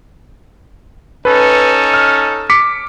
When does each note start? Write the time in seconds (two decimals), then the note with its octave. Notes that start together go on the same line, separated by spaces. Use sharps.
1.25 C#4 D#4 A4 B4
1.94 F6
2.50 D6 B6 C#7